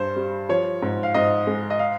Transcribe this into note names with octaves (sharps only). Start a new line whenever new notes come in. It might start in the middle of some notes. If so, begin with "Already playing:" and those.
Already playing: G2 G3 C5
G3
F3 C#5
G#2
F5
G#2 D#5
G#3
D#5
F5